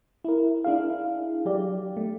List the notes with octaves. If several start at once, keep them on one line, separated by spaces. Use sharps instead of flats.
E4 A#4
D4 E4 G#4 F5
F#3 G4 D5
A3